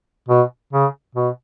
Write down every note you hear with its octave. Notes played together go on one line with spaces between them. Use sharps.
B2
C#3
B2